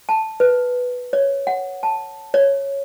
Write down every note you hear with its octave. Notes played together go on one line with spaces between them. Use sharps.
A5
B4
C#5
F#5
A5
C#5